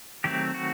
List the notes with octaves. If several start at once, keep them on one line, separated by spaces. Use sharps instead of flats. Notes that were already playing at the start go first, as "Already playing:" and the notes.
D#3 F#3 A3 C4 G4
F#4